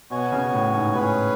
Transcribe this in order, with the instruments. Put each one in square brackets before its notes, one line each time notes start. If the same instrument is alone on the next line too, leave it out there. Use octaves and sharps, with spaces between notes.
[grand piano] B2 [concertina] B3 F#4 C#5 G#5
[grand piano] C#3
A2
G#2
[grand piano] A2 [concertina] C#4 G#4 B4